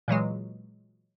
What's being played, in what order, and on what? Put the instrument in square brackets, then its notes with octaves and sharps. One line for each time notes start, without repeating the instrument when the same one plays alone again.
[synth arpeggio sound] A#2 E3 F#3 G#3